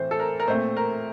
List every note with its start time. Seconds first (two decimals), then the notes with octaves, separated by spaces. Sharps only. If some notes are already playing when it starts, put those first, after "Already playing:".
Already playing: A2 E3 A3 C4 C5
0.11 A4
0.20 A#4
0.40 A#4
0.47 A#2 A3 C4 C5
0.77 A#4